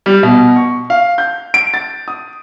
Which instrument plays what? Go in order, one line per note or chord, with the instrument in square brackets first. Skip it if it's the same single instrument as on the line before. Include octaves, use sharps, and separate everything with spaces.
[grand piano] G3
B2
C#6
F5
G6
D7
A6
D#6